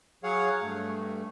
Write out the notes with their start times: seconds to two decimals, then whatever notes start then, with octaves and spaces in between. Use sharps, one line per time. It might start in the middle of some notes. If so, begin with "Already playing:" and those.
0.24 F#3 G#4 C#5 F5 F#5
0.62 G2 A3